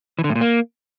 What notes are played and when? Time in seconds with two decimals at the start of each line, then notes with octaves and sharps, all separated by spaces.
0.19 E3
0.24 D3
0.30 A2
0.35 A#2
0.41 A#3